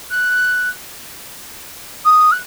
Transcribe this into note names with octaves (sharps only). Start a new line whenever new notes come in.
F#6
D#6
F#6